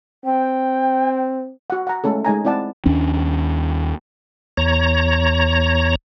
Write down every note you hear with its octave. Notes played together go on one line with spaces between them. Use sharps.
C4 G5
F#4 F#5
F#5 A#5
G#3 A3 C#4 A4
G#3 D#4 G#5 A#5
C4 E4 D5 F#5 A5
D#2 C#4 D4
E2 C#5 A#5